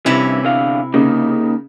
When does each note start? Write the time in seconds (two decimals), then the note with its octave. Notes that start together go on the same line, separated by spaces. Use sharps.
0.06 G2 C3 E3 C#4 E4
0.43 E2 D3 F5
0.94 C#3 A#3 D#4